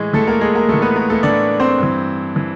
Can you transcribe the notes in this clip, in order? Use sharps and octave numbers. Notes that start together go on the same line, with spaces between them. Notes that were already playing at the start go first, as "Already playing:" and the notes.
Already playing: A2 E3 G#3 G#4
A2 E3 A3 A4
A#3 A#4
G#3 G#4
A#3 A#4
A2 E3 A3 A4
B3 B4
A#3 A#4
A3 A4
A2 E3 D4 D5
C4 C5
G2 E3
E3